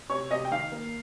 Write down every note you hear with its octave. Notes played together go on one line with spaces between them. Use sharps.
C3 C#5
C3 D#5
G5
D#3 F5
A#3